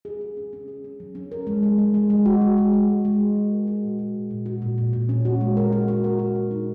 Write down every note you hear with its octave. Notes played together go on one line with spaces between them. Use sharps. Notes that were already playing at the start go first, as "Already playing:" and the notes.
G#4
G#4
C#4
C#4
G#4
C#4
F#3
C#4
A#4
G#3
G#3
G#3
G#3
G#3
F#4
G#3
G#3
G#3
G#3
G#3
F#4
F#4
A#4
F#4
A#2
F#4
A#2
A#2
F#4
A#2
A#2
A#2
C#4
F#4
G#3
A#4
F#4
F#4
A#4
F#4
F#4
D#4